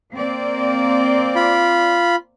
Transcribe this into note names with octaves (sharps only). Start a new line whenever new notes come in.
A#3 C4 D5
F4 B5